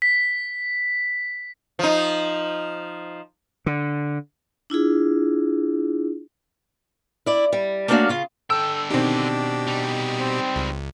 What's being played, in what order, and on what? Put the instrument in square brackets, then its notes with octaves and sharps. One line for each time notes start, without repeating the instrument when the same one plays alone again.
[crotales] B6
[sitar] F3 D#4
[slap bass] D3
[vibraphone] D4 E4 F4 G#4
[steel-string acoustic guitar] E4 D5
G3
A3 A#3 C#4 D4 F#4 F5
C#3 F4
[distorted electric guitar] D3 G5 [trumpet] A4 [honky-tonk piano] E6
[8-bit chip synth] B2 G4 [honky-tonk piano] D#3 C4 [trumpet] D4
[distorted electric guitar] G3 D#4
[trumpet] C4
[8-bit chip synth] C#2